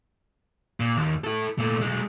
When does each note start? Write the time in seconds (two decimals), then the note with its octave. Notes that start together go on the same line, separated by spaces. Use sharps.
0.80 A#2
0.97 D#2
1.24 E4 A4
1.58 A#2 A3
1.82 B1 G#3